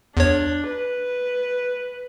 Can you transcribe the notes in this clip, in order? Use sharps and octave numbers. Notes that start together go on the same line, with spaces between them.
E2 D4 C#5
B4